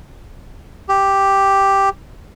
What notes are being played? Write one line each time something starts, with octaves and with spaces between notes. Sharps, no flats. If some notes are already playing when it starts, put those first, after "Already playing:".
G4